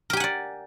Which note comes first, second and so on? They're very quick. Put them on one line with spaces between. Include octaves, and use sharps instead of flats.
A#4 G4 G#5 F#5 D5